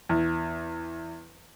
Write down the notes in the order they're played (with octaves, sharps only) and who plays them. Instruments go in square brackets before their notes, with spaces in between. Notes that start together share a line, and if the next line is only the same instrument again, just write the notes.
[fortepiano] E2